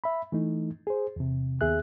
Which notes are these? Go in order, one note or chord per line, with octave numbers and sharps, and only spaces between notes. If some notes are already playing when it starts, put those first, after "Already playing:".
E5 B5
E3 A3 D#4
G#4 C5
E2 C3
D#2 B3 G#4 E5 F#6